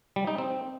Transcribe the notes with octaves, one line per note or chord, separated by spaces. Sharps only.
G3
D#4
C4